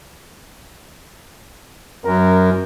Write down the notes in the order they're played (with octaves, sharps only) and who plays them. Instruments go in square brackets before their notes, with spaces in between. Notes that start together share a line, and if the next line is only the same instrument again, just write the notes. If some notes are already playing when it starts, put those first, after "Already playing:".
[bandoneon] F#2 [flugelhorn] A#4